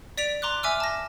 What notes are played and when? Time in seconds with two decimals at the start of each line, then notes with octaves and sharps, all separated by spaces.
0.18 D5 B6 D7 F7
0.42 A#5 C6 D6 F#6
0.63 E5 G#5 D6 E6 F6
0.80 A5 A#6